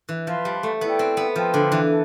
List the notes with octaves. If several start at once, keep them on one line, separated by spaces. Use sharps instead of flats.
E3
F3 B4 F5 A5 C6
G3
A3
B3 E4 B4 D5 G5
C4
B3
F3 A4 C5 G5 C6
D3
E3
A4